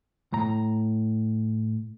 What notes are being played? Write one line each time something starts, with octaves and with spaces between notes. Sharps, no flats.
A2 A#5